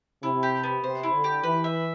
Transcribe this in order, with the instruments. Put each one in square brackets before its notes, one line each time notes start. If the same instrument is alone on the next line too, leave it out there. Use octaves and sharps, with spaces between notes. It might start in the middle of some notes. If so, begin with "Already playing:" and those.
[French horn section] C3 [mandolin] E4
[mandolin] G4
B3
[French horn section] C3 [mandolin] C5
[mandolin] E4
[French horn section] D3
[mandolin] G4
[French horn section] E3 [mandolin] B4
[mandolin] E5